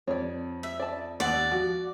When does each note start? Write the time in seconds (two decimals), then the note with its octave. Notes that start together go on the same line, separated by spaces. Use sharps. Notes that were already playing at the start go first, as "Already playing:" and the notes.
0.07 F2 C#5 D5
0.63 E5
0.80 D5 A5
1.20 D#2 B3 D5 F#5 E6
1.51 F3 F#4